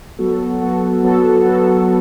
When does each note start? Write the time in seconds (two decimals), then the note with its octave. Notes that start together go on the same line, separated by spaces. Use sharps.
0.19 F#3 B3 F#4 A4
0.61 F#3 B3 F#4 A4
1.03 F#3 B3 F#4 A4
1.44 F#3 B3 F#4 A4